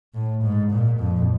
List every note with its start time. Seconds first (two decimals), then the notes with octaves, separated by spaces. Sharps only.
0.14 A2
0.43 G#2
0.71 A#2
1.00 F2